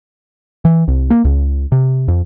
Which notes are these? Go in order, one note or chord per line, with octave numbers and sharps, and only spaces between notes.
E3
C2
A#3
C#2
C3
F2